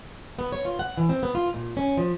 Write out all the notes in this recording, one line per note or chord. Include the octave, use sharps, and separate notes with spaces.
B3
C#5
F4
F#5
E3
C4
B3
F4
A#2
C#4
F3